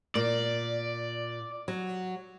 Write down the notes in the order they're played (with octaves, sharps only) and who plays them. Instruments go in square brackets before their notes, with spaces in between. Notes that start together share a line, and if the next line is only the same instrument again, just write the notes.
[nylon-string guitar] A#2 [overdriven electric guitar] D5
[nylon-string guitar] F#3